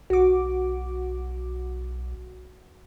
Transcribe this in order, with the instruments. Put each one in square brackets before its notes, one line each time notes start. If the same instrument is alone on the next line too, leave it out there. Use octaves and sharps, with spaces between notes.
[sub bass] B1 [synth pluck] F#4 D6